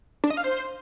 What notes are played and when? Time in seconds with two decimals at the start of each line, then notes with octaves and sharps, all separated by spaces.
0.24 D4
0.30 D#5
0.37 F5
0.44 C5